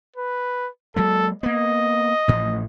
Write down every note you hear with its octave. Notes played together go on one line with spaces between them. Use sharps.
B4
F#3 G#3 A#3 A4
A#3 B3 D#5
A1 A2 F3